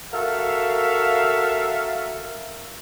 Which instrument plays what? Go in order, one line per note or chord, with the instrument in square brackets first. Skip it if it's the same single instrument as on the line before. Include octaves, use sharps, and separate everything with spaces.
[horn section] F#4 A4 A#4 E5 F5